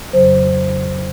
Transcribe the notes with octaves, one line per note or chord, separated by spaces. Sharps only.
F2 C#3 F#3 C5